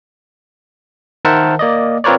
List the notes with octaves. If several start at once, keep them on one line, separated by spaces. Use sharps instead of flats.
D#3 A#4 C5 E5 F#5 A5
A#3 D5 D#5
C4 F4 A#4 B4 C#5 D5